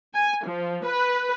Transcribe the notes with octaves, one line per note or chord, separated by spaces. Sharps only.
G#5
F3
B4